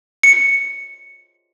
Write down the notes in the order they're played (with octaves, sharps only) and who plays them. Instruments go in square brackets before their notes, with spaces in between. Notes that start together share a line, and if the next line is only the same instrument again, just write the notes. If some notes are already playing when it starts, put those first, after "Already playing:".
[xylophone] C#7